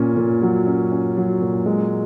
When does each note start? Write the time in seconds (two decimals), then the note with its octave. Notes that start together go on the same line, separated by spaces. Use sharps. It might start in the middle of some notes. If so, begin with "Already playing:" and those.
Already playing: A#2 C#4
0.17 A#2
0.42 F#3
0.67 C#4
0.92 C#4
1.17 F#3
1.42 A#2
1.66 G#3